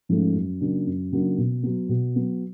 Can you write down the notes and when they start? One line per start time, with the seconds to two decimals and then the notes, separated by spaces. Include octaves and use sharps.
0.09 G#2 F3 A3 C#4
0.34 F#2
0.61 C#3 F#3 A#3 D4
0.87 F#2
1.12 C#3 F#3 A#3 D4
1.38 B2
1.63 F#3 B3
1.89 B2
2.16 F#3 B3